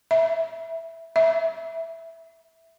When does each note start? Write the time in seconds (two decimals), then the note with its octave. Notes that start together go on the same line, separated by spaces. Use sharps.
0.11 E5
1.16 E5